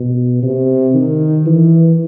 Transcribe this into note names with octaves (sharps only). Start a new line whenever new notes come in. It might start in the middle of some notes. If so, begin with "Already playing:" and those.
Already playing: B2
C3
D#3
E3